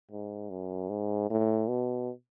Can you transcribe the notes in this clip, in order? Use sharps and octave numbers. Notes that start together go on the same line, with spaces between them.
G#2
F#2
G#2
A2
B2